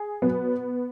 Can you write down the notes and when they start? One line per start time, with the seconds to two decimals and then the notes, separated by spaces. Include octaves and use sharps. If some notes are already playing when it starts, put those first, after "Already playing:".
Already playing: G#4
0.22 B2 F#3 B3